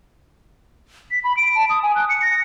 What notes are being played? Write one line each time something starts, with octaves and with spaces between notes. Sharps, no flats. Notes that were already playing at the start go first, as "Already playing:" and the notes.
B6
B5
D7
A5
D#6
G#5
F#6
C#7
A#6